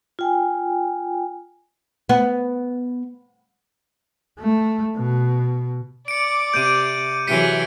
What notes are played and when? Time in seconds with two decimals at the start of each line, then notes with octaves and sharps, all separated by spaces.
0.19 F4 G5 G#5
2.09 B3
4.40 A3
4.97 B2
6.08 D5 D6 C#7 D7
6.54 C3 G6 D#7
7.27 C3 E3 F#3 G#4 G5 B6 C#7 D#7